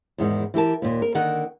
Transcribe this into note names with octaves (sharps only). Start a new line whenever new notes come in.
E2 G#2 D#3
E3 G4 A#4 A5
D#2 A#2
A#4
D3 D#3 A#4 F#5